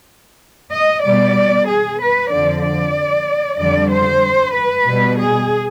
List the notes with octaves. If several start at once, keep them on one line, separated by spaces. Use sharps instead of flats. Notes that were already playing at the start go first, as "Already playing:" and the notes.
D#5
B2 G3 D5
G#4
B4
F2 D3 F3 D5
D5
F2 D3 G3 D5
C5
B4
B2 G3
G#4